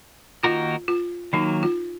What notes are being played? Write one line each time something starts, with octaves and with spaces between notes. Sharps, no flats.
D#3 A#3 D#4 F4 F#4 A#4
F4
D#3 F#3 A#3 D#4
F4